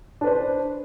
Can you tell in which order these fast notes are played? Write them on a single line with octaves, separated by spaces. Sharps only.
D4 B4 C5